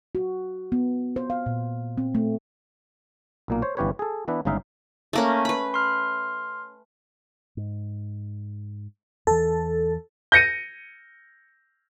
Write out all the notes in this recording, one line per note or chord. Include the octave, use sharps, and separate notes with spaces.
F#4
B3
C5
F5
A#2
C4
A3
B1 A#2 A#3
C5 C#5
G1 E3 C#4 G4 B4 C#5
G#4 A4
E3 B3 D4 E4 B4
G1 C#3 G#3 D#4 E5 F5
A3 A#3 C#4
B4 B5
C6 F6
G#2
E2 E3 A4
G6 A#6 C#7 D#7